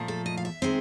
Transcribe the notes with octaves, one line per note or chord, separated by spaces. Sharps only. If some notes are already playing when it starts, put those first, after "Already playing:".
Already playing: A#2 F3 A3
A4
D#5
F5
E5
D#3 G#3 C4